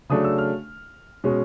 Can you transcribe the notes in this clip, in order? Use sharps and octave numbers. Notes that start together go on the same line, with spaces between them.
C#3 F#3 A3 D4 D#6
E6
F6
B2 G#3 C#4